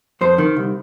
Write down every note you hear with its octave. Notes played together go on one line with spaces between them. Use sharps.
F2 C5
D#3
C2